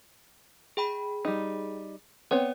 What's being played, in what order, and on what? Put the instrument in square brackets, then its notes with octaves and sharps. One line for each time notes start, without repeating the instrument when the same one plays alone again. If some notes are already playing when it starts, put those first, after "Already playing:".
[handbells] G#4 G5 B5
[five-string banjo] G3 D#4
[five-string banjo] B3 C4 C#5 [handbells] D5